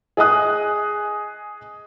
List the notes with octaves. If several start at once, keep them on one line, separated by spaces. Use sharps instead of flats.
G#4 D#5 G#5 D#6 F#6